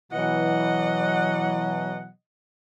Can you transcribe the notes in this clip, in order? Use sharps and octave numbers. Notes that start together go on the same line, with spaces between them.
B2 E3 F#3 D#5 F#5